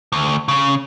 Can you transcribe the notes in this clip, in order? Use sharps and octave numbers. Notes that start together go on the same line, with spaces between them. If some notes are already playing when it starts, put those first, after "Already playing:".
D2
C#3